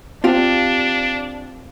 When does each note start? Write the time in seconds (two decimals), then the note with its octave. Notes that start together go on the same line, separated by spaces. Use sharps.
0.24 C4 D4 F4 G4